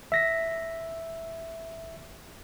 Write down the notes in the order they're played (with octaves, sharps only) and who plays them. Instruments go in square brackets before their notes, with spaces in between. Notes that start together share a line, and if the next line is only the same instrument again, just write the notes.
[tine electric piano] E5 A#6 B6